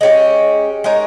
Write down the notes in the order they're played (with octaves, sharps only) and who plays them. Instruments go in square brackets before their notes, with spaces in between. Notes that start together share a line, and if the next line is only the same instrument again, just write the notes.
[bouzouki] G#3 C#4 G4
G#3 D#4 A#4 C#5